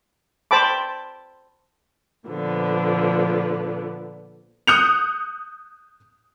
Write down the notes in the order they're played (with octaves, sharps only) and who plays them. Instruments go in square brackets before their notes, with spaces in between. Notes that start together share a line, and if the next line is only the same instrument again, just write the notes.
[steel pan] C5 G5 A5 B5 D6
[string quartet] A#2 D3 F3 B3
[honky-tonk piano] D#6 F#6 G6 C#7 F7